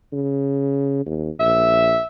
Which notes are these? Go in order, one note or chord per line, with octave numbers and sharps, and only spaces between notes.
C#3
D#2
A#1 E5